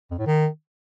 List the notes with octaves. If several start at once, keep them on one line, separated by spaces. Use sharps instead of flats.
F2
A2
D#3